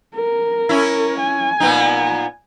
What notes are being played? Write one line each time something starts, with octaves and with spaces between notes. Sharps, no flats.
A#4
C#4 E4
G#5
A#2 B3 D#4